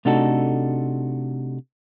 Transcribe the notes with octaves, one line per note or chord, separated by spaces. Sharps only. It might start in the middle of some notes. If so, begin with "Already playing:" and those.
C3 A3 D4 D#4 F#4 A4